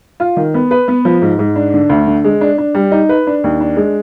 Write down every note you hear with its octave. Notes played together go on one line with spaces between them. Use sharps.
F4
D#3
B3
B4
B3
F3
G#2
G#2
D4
D3
D2
D3
G#3
D4
D4
G3
D#4
B4
D4
D#2
D4
G#3